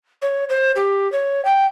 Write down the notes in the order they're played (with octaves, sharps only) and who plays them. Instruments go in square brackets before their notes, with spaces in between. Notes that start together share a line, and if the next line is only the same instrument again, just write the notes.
[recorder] C#5
C5
G4
C#5
G5